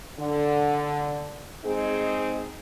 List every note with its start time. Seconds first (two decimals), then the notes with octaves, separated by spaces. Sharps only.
0.19 D3
1.64 G#3 C4 D#4 G#4